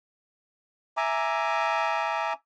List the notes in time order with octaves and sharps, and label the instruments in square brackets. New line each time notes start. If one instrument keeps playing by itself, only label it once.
[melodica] E5 G#5 A#5 D6